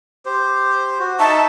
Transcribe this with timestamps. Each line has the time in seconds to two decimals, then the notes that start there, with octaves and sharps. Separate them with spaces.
0.26 G4 C5
0.99 F#4
1.19 D#4 E5 A5